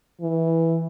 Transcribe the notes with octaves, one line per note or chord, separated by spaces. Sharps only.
E3